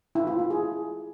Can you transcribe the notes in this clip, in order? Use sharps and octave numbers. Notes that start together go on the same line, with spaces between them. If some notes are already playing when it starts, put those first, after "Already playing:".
E4
F4
E4
G#4